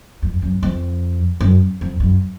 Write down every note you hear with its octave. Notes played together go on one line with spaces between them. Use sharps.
F2
F#2
F2
F#2
F2
F#2